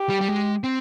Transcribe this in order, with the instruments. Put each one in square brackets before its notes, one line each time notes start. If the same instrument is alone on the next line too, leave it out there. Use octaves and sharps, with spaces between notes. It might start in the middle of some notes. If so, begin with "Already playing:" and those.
Already playing: [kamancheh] G4
[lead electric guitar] G3
G3
G#3
C4